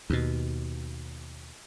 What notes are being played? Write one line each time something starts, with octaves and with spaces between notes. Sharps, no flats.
D#2 B2